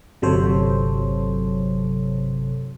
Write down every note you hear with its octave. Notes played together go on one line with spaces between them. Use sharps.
G1 C3 F#3 A4 C5 C#5